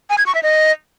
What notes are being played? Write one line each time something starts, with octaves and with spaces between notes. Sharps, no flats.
G#5
G#6
C#6
E5
D#5